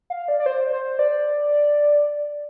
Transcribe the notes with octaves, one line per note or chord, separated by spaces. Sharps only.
F5
D5
D5
C5
C5
D5